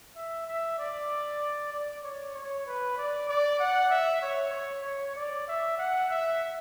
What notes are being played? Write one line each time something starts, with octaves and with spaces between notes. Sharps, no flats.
E5
E5
D5
D5
C#5
C#5
B4
D5
D5
F#5
E5
C#5
C#5
C#5
D5
E5
F#5
E5